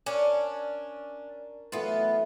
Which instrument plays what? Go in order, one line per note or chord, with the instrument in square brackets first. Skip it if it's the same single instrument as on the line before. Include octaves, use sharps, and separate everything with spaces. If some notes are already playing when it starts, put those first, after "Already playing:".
[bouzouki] C#4 D4 [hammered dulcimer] A#4
[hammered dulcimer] A2 E3 F#3 [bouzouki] B3 F4